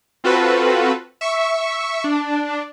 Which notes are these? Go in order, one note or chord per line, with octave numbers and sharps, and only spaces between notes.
C4 F4 F#4 A4 B4
E5 C#6
D4